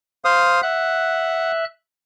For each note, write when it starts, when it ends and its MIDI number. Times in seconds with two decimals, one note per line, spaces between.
0.25 0.61 72
0.25 0.61 77
0.25 0.61 87
0.63 1.64 76
0.63 1.51 78
0.63 1.64 90